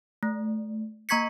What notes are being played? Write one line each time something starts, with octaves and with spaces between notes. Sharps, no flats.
A3
A#3 A#5 C#6 G#6 B6 C#7